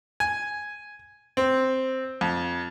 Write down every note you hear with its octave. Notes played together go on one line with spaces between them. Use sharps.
G#5
C4
F2